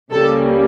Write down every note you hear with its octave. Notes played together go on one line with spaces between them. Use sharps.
C#2 C#3 G3 A#3 A4